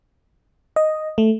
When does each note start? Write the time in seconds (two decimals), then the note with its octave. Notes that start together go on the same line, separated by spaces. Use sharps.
0.76 D#5
1.18 A3